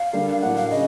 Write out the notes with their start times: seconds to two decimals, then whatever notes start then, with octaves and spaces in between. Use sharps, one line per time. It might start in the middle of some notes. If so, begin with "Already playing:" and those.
Already playing: F5
0.13 D3 G3 A#3
0.41 A2 F#3 A#3 D4 F#5
0.56 F5
0.70 C#3 D#5